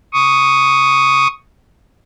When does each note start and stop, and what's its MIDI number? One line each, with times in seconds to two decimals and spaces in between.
0.13 1.28 85
0.13 1.28 87